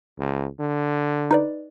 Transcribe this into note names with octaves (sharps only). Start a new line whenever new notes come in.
C#2
D3
D#4 B4 D5